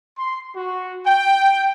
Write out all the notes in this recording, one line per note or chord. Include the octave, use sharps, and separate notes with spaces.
C6
F#4
G5